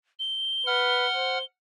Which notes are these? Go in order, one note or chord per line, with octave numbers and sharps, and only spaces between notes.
G7
B4 F#5 F6
C5